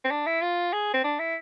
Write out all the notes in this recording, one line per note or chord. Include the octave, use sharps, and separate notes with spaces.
C4
D4
E4
F4
G#4
C4
D4
E4